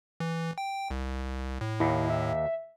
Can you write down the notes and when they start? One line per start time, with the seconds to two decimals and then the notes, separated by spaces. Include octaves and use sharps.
0.20 E3
0.58 G5
0.91 C2
1.61 A2
1.80 D#2 E4
2.10 E5